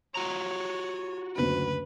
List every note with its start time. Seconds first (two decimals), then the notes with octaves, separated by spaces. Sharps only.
0.15 F4 F#4 C#5 A#5
1.36 F#1 D2 D4 B4